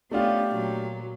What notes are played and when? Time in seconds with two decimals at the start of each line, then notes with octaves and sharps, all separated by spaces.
0.11 A3 B3 C#4 D4 F4 G4
0.49 A#2 F#3